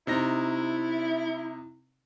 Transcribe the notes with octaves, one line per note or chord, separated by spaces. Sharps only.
C3 D#4 E4 A#6